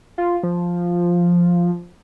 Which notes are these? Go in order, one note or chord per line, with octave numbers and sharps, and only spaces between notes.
F4
F3